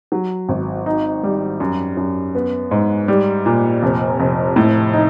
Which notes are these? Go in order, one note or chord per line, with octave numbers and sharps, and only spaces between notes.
F#3
G#1
D#4
G3
F#2
F#2
B3
G#2
G3
A#2
F1
F1
A2
D#4